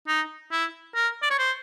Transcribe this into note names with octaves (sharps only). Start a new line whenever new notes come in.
D#4
E4
A#4
D5
C#5
C5